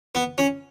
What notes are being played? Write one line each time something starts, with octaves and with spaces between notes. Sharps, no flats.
B3
C#4